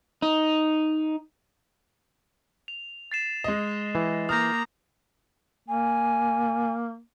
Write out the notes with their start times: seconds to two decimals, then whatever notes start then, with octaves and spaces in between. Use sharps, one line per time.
0.22 D#4
2.68 F7
3.12 A6 C7 E7
3.44 G#3 D#5
3.95 E3
4.29 A#3 A#5 D#6 F6 G6
5.68 A#3 G#5